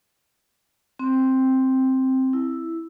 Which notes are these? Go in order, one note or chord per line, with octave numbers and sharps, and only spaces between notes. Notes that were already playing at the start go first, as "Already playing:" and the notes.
C4
E4